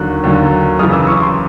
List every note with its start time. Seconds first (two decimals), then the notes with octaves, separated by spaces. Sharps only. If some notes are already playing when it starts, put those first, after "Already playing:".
Already playing: D#2 D3 F#3 F#6
0.24 D#2 D3 F#3
0.79 F#2 C#3 E3 D#6 F6
0.92 D6 E6
1.07 C#6 D#6
1.20 C6 D6